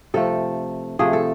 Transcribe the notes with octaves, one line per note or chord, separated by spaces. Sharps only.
C3 F3 A3 A4
C3 F3 A3 G#4
A4